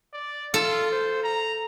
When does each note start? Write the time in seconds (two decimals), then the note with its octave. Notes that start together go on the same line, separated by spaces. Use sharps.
0.13 D5
0.54 F4 A4
0.92 C5
1.23 A#5